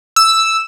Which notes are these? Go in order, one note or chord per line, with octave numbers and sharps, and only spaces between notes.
E6